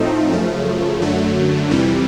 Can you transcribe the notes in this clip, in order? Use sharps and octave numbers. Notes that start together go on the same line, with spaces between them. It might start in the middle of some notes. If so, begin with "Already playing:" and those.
Already playing: A2 F3 A3 C4 D#4
F#2 C#3 F3 A3
F#2 D3 F#3 A3
F2 C3 E3 G3